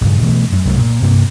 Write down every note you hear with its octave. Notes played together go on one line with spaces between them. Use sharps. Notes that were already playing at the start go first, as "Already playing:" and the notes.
A#1 G2 C#3
B2 E3 F3 A3
F#2
C2 F#2 A3
A#2
G2 C3 A#3